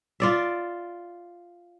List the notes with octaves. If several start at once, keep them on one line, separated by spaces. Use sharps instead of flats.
F4 D5 E5